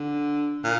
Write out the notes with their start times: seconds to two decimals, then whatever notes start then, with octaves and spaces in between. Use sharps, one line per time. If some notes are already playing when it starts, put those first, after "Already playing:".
Already playing: D3
0.64 A#2